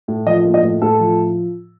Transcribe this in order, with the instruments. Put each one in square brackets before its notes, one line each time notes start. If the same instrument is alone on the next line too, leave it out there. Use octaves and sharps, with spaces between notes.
[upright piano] A2
F3 D#5
A#3
D#5
A2
A2 A4
F3